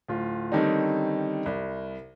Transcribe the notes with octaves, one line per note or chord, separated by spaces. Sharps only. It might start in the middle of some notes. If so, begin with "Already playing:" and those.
D1 F4
D3 D#3 G3 C4 C#4 D#4
C2